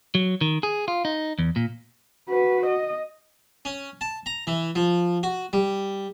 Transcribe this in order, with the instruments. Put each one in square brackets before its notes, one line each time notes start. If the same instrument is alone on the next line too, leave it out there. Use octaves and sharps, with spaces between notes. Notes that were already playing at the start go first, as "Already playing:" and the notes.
[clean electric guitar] F#3
D#3
G#4
F4
D#4
E2
A#2
[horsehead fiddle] F#4 B4
D#5
[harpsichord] C#4
A5
A#5
E3
F3
F#4
G3